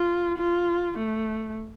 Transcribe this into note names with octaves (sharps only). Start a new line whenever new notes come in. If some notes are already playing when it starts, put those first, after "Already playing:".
Already playing: F4
F4
A3